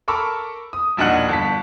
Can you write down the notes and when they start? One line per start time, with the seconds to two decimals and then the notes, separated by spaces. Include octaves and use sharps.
0.08 A4 A#4 B5 C#6 D6 E6
0.73 D#6
0.97 E1 A#1 D4 D#4 F#5 F#6
1.29 G1 A5 B6